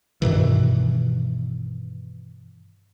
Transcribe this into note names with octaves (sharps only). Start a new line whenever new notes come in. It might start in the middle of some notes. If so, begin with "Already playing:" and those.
G2 B2 D#3 E3